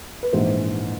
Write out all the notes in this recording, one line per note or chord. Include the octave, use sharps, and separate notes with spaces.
B4
A#1 G#2 E3 C5